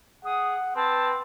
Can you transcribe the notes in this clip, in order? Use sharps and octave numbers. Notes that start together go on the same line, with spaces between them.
G#4 F#5 D#6
C4 B4 A5